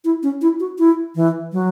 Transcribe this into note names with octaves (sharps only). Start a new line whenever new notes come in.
E4
C#4
E4
F#4
E4
E3
F#3